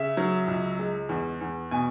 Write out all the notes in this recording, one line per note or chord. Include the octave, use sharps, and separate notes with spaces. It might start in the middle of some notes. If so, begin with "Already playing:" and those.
Already playing: C#3 E5
F#3
C#2
G#3
E2
E2
B2 G#5